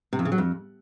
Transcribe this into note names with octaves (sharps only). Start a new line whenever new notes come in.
C3
F2
C#3
F#3
F2